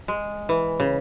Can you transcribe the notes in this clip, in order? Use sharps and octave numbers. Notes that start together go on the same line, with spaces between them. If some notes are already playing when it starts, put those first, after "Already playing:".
G#3
E3
C#3